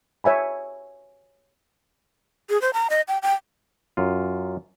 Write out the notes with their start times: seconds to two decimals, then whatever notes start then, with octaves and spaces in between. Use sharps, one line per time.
0.24 C#5 E5 G#5 B5
2.50 G#4
2.62 C5
2.74 A#5
2.90 D#5
3.08 G5
3.22 G5
3.97 F#2 F4